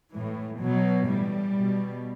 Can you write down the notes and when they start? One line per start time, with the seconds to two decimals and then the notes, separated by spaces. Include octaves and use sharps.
0.11 A2 E3
0.60 B2 F#3
1.08 A2 E3 G3
1.56 B2